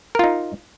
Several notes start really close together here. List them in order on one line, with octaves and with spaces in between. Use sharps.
A#4 F4 D#4